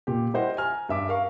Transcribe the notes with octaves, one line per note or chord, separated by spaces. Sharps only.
A#2 G4
G3 E4 C5 D#5 F#5
G#5 A#5 F6
G2 E5 D6
A#4 F5 C#6